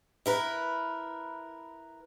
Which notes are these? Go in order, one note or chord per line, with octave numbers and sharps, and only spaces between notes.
E4 A#4 B4